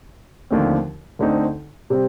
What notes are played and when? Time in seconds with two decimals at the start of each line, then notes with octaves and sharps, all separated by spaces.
0.51 D#2 D3 F3 A3 C4
1.19 D2 D3 A3 C4 D#4
1.90 C3 G3 C4